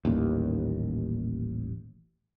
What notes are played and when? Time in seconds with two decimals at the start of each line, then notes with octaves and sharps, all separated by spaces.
0.05 D#1 A1 D#2